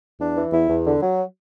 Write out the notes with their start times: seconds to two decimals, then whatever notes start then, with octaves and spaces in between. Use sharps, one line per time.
0.18 E2 D4
0.36 E3
0.52 E2 E4
0.68 E2
0.85 D3
1.01 F#3